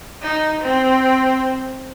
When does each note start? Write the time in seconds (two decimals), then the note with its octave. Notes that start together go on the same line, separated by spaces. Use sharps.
0.22 D#4
0.61 C4